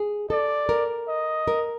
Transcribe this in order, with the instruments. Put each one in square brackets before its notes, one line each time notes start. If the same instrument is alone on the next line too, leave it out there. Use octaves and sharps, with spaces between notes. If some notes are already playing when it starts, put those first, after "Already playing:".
Already playing: [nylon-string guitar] G#4
[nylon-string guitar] A4 [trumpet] D5
[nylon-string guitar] A#4
[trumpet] D#5
[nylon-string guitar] A#4